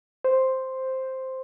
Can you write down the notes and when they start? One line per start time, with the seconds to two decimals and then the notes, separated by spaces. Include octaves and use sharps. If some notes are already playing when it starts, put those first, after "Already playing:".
0.24 C5